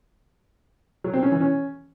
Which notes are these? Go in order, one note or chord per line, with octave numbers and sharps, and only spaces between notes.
F#3
C4
C#4
E3
C#4